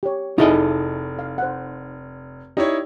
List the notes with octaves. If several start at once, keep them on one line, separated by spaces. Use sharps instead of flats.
G4 C#5
F1 D#4 E4 G#4 A4 D#5
F5
C5 F#5
D#4 E4 G4 C#5 D5